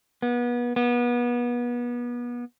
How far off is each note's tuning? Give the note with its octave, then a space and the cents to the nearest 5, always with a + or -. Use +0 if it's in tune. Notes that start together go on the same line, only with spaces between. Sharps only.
B3 -30
B3 -30